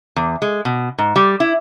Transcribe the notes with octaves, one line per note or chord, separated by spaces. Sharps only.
E2
G#3
B2
G#2
G3
E4